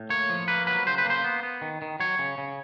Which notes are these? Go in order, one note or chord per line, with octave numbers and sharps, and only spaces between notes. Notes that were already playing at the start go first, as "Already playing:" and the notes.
Already playing: A2
A#3 C#5
F3
A#3 B4
F#3 B4
C#3 C5
B4
A#3
C5
B3
B3
D#3
D#3
F#3 C#5
C#3
C#3